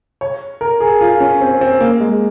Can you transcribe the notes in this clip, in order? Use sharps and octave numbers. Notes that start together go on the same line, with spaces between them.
C#5
A#4
G#4
F4
C#4
C4
C4
A#3
G#3